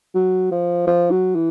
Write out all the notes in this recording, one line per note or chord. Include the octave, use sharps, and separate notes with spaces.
F#3
F3
F3
F#3
E3